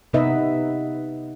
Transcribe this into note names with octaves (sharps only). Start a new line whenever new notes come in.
C3 B3 D#4 B4 D#5 E5